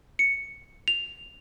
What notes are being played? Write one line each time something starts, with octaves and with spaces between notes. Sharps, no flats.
C#7
F7